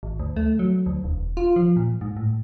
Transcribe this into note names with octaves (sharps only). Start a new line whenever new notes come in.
G#1
D2
A3
F#3
D2
E1
F4
F3
A#2
G#2
A2